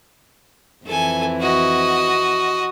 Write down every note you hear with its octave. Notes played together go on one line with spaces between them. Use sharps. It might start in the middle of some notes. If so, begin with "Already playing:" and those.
F2 E3 A4 G#5
F#4 D#5